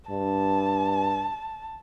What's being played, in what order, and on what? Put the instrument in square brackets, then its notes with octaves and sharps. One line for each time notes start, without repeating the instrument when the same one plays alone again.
[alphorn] G2 [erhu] A5